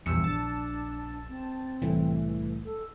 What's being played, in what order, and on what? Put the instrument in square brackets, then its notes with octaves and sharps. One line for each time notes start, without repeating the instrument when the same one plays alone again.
[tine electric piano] A#1 E6 C#7 [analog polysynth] E2 G2
[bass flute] D4 [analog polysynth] A5
[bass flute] C4
[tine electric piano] C2 A2 A3 [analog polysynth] E3
[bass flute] A4